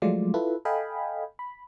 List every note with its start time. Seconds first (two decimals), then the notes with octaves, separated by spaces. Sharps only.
0.02 F3 F#3 G#3 A3 F4 D5
0.34 E4 F4 A4 B4
0.65 A4 D#5 F5 G5 G#5 B5
1.39 B5